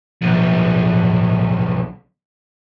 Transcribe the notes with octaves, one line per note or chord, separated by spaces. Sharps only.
B1 F3